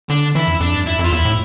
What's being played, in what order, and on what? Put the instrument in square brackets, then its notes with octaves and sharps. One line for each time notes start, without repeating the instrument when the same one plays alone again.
[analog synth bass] D3 [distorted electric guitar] D4
[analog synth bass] E3 [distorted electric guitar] E4
[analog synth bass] F2
[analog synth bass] F2 [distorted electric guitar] D4
[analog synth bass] G2
[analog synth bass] F2 [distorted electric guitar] E4
[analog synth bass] F2
[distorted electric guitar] F4
[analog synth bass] E2 [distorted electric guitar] E4
[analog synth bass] A2